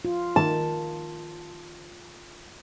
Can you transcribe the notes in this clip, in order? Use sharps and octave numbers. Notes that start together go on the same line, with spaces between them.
F4
D#3 A5